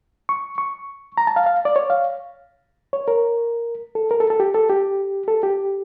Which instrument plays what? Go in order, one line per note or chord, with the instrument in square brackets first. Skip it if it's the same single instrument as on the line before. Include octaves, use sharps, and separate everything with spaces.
[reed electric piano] C#6
C#6
A#5
A5
F5
F5
D5
C#5
F5
C#5
A#4
A4
A#4
A4
A4
G4
A4
G4
A4
G4